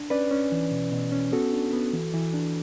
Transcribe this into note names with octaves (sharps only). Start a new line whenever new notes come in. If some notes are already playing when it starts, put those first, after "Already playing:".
Already playing: D4
C#4 B4 D5
C#4
E3
B2
B2
C#4
B3 F#4 A4
D4
B3
E3
E3
D4